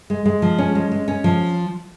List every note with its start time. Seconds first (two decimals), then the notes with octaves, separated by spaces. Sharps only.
0.10 G#3
0.26 G#3
0.42 F3
0.58 C#4
0.75 G#3
0.92 G#3
1.08 C#4
1.24 F3